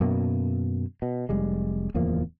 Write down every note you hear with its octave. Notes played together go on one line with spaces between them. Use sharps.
F#2 B2 A#3
B2
F1 G3 G#3
D1 E2 F3 A#3